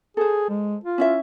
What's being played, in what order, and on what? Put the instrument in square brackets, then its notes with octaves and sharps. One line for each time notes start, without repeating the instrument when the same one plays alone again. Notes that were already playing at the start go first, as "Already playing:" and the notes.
[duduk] G#4 [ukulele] A4 C5
[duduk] G#3
F4
[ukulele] C#4 E4 E5